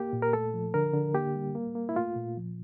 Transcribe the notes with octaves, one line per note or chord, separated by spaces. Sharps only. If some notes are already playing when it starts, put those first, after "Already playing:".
Already playing: A#3 G4
A#2
A#4
A3 A4
F3
D3 A#4
D3
A#3 G4
G3
A#3
A#3
E4
A3 F4
A#2
F3